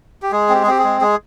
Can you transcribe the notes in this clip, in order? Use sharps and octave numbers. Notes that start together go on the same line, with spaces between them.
G4
G#3 G#4
C4
G4
G#4
C4 G4
G#4
G#3
G#3 G#4